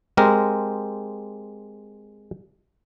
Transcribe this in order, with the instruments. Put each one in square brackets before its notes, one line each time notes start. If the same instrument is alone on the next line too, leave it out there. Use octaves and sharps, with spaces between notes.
[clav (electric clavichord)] G#3 C4 G4 A#4